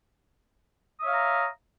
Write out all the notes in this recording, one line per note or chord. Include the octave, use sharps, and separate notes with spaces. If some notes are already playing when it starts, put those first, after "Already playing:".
C#5 E5 F5 A#5 D#6